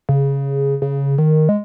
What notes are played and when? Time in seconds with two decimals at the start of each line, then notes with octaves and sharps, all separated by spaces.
0.09 C#3
0.82 C#3
1.18 D#3
1.49 G#3